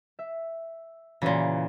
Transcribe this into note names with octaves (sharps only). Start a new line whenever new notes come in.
E5
A#2 C#3 E3 F#4 B4